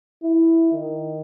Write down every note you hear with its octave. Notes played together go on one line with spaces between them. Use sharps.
E4
D#3